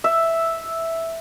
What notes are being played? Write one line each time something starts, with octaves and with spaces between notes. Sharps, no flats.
E5